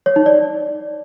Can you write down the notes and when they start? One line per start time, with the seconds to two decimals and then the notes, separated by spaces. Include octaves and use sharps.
0.06 C#5
0.16 D#4
0.26 D5